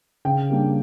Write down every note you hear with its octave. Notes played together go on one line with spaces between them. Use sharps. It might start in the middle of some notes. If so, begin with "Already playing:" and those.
C#3 G5
G3 A#3 D4